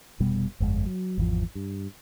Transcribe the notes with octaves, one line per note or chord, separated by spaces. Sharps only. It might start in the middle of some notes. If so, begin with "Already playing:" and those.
F1 B2 G3 B3
G1 F2 G#3
F#3
G#1 E2 F3
G2